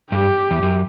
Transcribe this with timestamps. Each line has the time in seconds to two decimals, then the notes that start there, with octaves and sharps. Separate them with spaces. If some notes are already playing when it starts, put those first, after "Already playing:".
0.12 G2 G4
0.51 E2
0.63 F#2